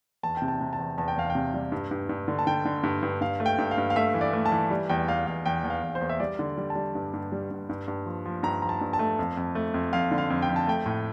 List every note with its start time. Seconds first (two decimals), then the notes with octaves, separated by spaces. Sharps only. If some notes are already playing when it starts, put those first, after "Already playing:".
0.23 E2 A5
0.37 C3 G5
0.48 A5
0.61 C3
0.73 A5
0.79 E2
0.98 E2 A5
1.08 G5
1.16 E2 F5
1.30 G5
1.35 C3
1.54 G3
1.72 G2
1.91 G2
2.09 G2
2.28 D3
2.39 A5
2.47 D3 G5
2.65 D3
2.83 G2
3.03 G2
3.21 G2 F5
3.40 A3
3.46 G5
3.58 G2
3.71 F5
3.78 G2
3.90 F5
3.96 A3 E5
4.14 E3
4.21 D5
4.33 A3
4.46 A5
4.52 E3
4.71 G3
4.89 E2 G5
5.08 E2 F5
5.27 E2 F5
5.46 E2 G5
5.64 E2
5.70 F5
5.83 E2
5.95 C5
6.01 E2
6.09 E5
6.20 G3 D5
6.39 D3
6.58 G3
6.70 A5
6.75 G3
6.95 G2
7.13 G2
7.32 G3
7.51 G2
7.69 G2
7.88 G2
8.06 F3
8.25 F3
8.43 G2 A#5
8.62 F3 A#5
8.69 A5
8.81 G2
8.93 A5
8.99 A3
9.19 F2
9.37 F2
9.55 A3
9.74 F2
9.93 F2 F5
10.11 D3
10.18 F5
10.30 F2
10.42 G5
10.49 F2
10.56 A5
10.67 A3 G5
10.86 A2